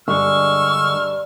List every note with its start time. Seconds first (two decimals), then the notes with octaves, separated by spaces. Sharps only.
0.08 G2 D3 G#3 C#6 E6 F6